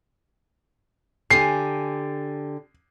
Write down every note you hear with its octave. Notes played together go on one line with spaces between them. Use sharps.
D3 G4 G#5 C7